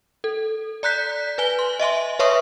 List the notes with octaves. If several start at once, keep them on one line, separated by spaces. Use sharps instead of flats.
A4
D5 A#5 F#6 G6 B6
B4 G#5 G7
C6
D#5 E5 G#5 C6
B4 C#5 E5 C6 C#6 D#6